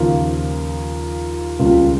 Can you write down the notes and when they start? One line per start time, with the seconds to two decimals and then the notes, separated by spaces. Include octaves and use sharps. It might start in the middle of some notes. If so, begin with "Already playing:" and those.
Already playing: D#2 C#3 F3 A#3 F4
1.59 C#2 C#3 G3 A#3 F4